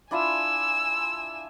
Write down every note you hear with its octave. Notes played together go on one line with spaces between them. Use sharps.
D4 E4 F4 G#5 E6